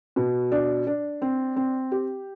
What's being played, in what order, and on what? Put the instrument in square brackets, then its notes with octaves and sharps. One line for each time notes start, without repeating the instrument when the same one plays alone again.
[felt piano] B2
D4
D4
C4
C4
G4